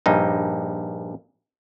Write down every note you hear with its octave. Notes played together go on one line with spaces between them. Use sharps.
A#1 G2 D#4